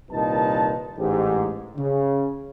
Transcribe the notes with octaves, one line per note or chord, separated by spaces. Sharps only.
C2 A#2 D#3 D#4 B4 A5
A1 G#2 G4
C#3